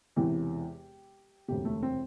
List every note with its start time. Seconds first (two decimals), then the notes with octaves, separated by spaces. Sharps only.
0.16 E1 E2 C3 E3 G4
1.48 E1 D2 C3 G4
1.65 A3
1.83 C4